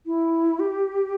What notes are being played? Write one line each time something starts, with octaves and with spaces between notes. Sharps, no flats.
E4
G4